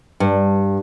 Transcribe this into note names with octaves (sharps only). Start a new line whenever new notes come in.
G2